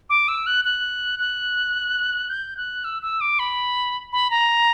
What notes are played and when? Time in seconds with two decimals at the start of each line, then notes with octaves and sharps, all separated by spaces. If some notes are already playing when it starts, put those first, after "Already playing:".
0.10 D6
0.28 E6
0.47 F#6
0.65 F#6
1.19 F#6
2.29 G6
2.57 F#6
2.84 E6
3.02 E6
3.21 D6
3.39 B5
4.13 B5
4.31 A#5